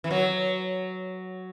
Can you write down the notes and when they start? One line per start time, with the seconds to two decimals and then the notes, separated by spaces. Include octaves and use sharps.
0.04 E3
0.11 F#3